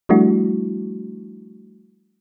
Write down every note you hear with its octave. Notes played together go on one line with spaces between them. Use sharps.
F3 G3 A3 D4 E4 F#4